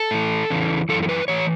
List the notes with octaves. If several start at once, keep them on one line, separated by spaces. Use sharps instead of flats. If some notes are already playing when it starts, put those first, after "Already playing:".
Already playing: A4
A2 E3
E2 C#3 E3
F#2 C#3 E3 A4
A4
B4
A2 E3 C#5